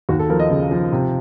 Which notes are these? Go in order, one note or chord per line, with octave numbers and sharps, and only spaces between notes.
D#2 F#4
A4
F3 A#4
D#5
C#3
F3
C3